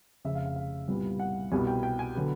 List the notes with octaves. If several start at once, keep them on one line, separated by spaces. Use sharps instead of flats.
F1 F2 C#3 E5
F5
F5
F5
C2 A#2 G3 B3
F#5
C2 B2 G3 B3 G#5
G5
G5
G#5
D3 F#3 B3